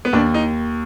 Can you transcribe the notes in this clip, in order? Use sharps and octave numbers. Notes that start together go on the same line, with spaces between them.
B3
D#2 D4
D#4